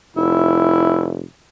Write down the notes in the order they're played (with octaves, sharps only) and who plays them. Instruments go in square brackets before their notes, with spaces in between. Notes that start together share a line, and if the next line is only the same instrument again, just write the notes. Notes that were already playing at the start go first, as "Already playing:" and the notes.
[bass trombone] F1 [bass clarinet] E4